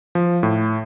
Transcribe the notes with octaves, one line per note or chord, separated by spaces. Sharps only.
F3
A2